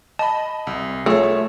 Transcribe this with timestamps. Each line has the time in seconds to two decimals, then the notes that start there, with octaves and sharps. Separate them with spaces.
0.19 D#5 A5 B5
0.67 C2
1.06 A3 F4 G#4 C#5